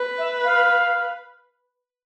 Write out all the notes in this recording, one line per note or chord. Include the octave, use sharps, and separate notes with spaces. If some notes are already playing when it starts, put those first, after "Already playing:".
Already playing: B4
E5
F5